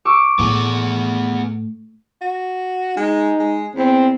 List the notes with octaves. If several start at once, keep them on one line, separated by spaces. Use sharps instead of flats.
C#6 D6 E6
A2 B3 G#4
F#4
G#3 D#4
G#3
E2 C4